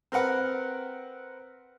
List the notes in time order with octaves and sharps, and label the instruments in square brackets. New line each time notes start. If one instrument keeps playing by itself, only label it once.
[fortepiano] C4 A#4 B4 F#5